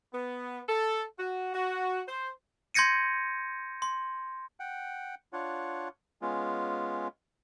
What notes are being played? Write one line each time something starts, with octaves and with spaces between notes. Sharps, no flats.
B3
A4
F#4
F#4
C5
C6 G6 G#6 A#6 C#7 D#7
C6
F#5 G5
D4 F4 C#5 F#5
G#3 B3 C#4 F4